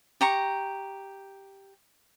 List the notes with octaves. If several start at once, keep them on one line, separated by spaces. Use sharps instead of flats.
G4 A#5 C#6